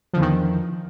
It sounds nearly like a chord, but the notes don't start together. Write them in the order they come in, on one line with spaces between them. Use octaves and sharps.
F3 D3 E2 D#3